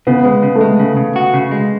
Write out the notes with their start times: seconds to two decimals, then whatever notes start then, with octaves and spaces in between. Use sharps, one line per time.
0.07 C#3 B3
0.25 G#3
0.43 C#3
0.55 A3
0.61 G#3
0.79 C#3
0.97 C#3
1.16 F#4
1.34 C#3
1.51 G#3